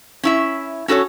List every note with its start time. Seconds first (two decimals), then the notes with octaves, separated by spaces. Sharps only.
0.23 C#4 E4 E5
0.88 C#4 F#4 A4 A#4 C#5